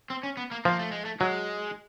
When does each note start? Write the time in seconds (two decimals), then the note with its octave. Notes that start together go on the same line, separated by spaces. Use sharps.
0.10 C4
0.23 C#4
0.37 B3
0.51 A#3
0.65 F3 A#3
0.79 A3
0.92 G#3
1.05 A3
1.20 F#3 G#3